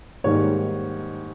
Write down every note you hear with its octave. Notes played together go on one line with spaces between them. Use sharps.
G#2 D#3 G3 A#3 C#5